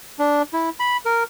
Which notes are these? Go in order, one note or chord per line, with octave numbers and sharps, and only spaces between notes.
D4
E4
B5
A#4